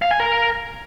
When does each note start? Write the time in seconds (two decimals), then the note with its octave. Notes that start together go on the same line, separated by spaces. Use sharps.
0.02 F5
0.11 G#5
0.20 A#4